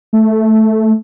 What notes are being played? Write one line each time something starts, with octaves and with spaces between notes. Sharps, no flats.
A3